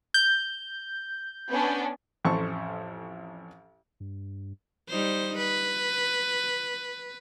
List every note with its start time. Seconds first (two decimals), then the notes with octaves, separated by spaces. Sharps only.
0.14 G6
1.51 B3 C#4 D4
2.25 A1 F2 A4 C5 C#6
4.00 G2
4.89 G3 D#4 C5
5.38 B4